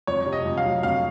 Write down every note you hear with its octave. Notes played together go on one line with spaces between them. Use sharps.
F2 C#5
C3
D#5
F2
F5
F#3
F2 F5